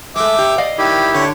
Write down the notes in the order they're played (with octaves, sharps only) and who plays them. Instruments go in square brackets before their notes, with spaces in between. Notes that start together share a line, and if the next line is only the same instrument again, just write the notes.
[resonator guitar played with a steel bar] G#3 A3 [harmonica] E5 D6
[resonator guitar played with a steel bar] A#2 G4
D5 D#5 F5
[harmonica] D#3 [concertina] E4 G4
[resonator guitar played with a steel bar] D3 D4 [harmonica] C#5